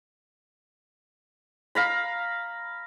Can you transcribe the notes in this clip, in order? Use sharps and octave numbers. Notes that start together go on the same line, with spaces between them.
F5 A#5 B5